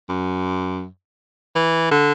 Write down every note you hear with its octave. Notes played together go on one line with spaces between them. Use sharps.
F#2
E3
D3